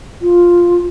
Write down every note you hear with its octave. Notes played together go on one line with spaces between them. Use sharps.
F4